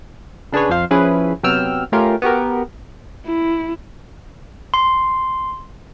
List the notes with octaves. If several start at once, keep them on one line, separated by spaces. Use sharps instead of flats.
C#3 D4 G#4 B4 C#5
F2 F3 C5 F5
F3 C#4 E4 G#4 B4
C3 F#3 B3 G5 E6 F6
A3 C#4 F4 G4 A#4
B3 F#4 G4 A#4
E4
C6